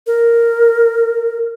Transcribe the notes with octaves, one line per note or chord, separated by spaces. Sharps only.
A#4